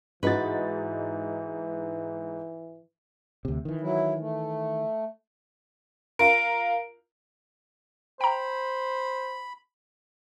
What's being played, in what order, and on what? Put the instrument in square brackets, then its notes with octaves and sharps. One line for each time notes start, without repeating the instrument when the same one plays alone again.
[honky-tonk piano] G#2 D#4 A6 [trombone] E3 [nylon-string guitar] F#4 B4
[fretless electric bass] D2 C3
D#3 E3
[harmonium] F#3 E4
A3
[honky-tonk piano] F4 A#4 [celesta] D7
[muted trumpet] C5 [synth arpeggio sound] G5 A#5 [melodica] B5